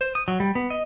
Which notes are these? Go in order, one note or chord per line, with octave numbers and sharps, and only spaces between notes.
C5
D#6
F#3
G3
B3
D#5